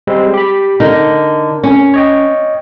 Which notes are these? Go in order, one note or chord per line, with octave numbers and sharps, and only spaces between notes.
G3 G#3 C4
G4 B5
D3 D#4 A#4
C#4
C#5 D#5 G5